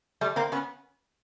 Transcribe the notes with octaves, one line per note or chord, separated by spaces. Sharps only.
G3 A3
A#3 C4
B3 C#4